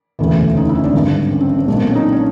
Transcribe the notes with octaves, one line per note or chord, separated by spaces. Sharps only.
E1 D2 C#3 E3
C#4 D#4
E4
C#4 D#4
C4 D4
G#1 G2 D3
C#4
C4
C#4
C4
B1 A#2 C#4
C4
C#4
D#4
D4
C#4